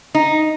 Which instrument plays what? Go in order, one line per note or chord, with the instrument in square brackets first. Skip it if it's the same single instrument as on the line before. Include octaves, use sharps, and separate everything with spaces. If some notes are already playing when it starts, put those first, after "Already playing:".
[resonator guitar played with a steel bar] D#4